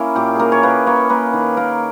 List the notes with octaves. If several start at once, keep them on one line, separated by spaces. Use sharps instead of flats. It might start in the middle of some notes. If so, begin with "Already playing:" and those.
Already playing: A#3 C#4 E4
A#2 G4
A#3 G#4 A#4
C#5
A#3 B4
A#3 C#5
A#3 B4
D#3
A#3 A#4